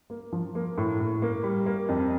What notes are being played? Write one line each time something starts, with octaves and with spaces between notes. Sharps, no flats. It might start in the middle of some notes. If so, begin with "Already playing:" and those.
A#3
F3
A#3
A2
A2
A#3
G3
A#3
F2